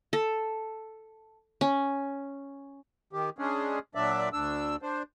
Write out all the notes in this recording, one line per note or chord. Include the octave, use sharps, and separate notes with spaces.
A4
C#4
D#3 G4
G#3 C#4 D4 G#4
A#2 F#3 D4 D5 E5
D2 D4 E6
D4 C5